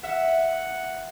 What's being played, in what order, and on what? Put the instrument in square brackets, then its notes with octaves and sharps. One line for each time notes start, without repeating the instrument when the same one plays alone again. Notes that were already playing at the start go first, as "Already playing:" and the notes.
[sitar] E5 [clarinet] F#5